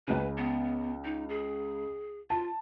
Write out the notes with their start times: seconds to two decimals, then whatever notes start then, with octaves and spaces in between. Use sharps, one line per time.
0.08 C#2 C#3 B4
0.38 B3
1.05 D#4
1.29 G#4
2.30 F4 A5